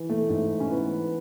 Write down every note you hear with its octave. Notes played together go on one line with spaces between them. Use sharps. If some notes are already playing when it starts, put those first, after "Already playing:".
Already playing: E3
A3
G#2 A3
C#4
E3 B3